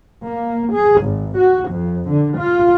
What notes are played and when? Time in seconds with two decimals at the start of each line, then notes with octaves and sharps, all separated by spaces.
0.26 A#3
0.74 G#4
1.05 G#1
1.39 F#4
1.73 F2
2.09 D3
2.41 F4